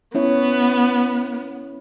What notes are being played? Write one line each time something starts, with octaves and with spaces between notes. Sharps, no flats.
B3 C#4 E4 C#5